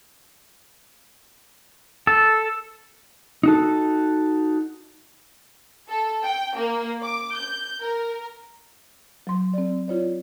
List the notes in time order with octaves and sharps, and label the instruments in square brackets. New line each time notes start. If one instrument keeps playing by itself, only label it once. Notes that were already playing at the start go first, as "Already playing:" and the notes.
[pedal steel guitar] A4
[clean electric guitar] D#4 F#4 A4
[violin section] A4
G5
A#3
D6
G6
A#4
[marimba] F#3 C6
C4 D5
E4 F4 C#5 D5